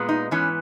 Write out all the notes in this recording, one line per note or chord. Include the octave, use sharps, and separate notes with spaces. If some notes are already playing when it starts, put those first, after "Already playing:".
Already playing: A#2 G#3 B3
D#4
G#2 E3 B3 C#4